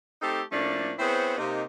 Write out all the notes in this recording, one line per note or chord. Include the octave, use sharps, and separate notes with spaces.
A3 C4 D#4 G4 A4
A2 F3 A3 A#3 C#4 D4
B3 C4 E4 G#4 C5 C#5
C3 A#3 D#4